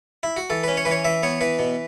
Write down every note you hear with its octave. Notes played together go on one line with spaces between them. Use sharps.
E4
F#4
E3 A4
C#4 B4
C#5
E3 B4
C#5
E3 E5
B3 C#5
E3 B4
B2